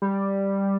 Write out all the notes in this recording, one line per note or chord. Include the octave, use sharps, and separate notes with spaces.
G3